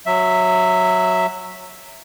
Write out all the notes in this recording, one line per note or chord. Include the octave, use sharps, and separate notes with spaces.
F#3 E5